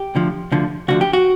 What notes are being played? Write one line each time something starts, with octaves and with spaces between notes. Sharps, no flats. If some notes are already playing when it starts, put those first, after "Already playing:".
Already playing: G4
D2 D3 F3
D2 D3 F3
D2 D3 F3 F#4
G4
F#4